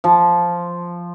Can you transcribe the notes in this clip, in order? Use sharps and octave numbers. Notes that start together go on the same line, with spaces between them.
F3